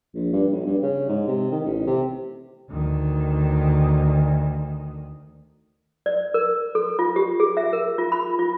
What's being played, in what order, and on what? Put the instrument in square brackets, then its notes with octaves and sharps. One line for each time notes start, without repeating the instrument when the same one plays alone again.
[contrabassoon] A#1
G2
B1
G2
C#3
G#2
C3
D#3
A1
C3
[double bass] D2 D#3
[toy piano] D5
A#4
A4
F4
G4
G#4
E5
A#4
F4
B5
F4